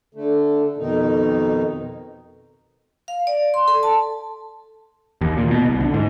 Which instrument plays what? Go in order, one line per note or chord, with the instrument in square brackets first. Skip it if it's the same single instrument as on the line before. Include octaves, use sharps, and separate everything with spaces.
[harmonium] D3 A3
F2 B2 D#3 D#4
[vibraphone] F5
D5
C6
A4
A5
[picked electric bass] D#2
A#2
B2
C2
D3
G#2